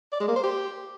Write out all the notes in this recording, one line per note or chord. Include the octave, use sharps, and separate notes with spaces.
D5
G#3
A#3
C5
G4